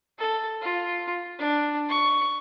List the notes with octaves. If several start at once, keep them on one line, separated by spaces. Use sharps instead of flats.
A4
F4
D4
C#6